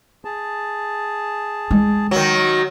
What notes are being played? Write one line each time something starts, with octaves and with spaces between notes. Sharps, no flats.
G#4 A5
G#3
D#3 F#3